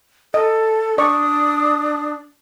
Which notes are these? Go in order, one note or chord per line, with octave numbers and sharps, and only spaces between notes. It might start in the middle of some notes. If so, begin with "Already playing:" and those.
A4 D#5
D4 D5 C#6 D#6